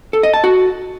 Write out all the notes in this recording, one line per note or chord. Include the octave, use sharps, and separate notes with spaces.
A4
D#5
A5
F#4